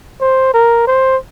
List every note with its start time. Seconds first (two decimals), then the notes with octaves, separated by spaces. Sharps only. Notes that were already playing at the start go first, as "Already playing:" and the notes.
0.21 C5
0.54 A#4
0.87 C5